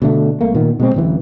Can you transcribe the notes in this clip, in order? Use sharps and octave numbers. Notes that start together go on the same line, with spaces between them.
B2 D3 A3
C2 A3 A#3
A#2 D#3 B3
B2 G#3 C4
D1 A1 E3